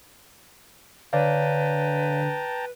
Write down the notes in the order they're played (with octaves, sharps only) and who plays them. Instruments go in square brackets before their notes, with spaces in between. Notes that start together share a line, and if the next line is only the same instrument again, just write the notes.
[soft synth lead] D3 [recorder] B4 [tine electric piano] C#5 D5 F5 [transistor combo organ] G5 A5 A#5